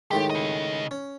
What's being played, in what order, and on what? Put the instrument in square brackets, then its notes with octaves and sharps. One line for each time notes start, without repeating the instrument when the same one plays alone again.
[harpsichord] A2 D#3 G#3 [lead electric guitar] G4
[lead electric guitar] C#3 D#5
[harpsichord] C#4